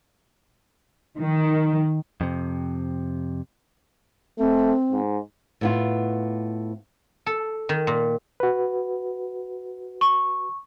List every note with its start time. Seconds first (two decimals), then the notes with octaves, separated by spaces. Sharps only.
1.18 D#3
2.21 F2 C3
4.39 A3 C4
4.92 G#2
5.61 A2 B3 F4
7.26 A4
7.69 D#3
7.87 A#2
8.40 F#4 B4
10.01 C#6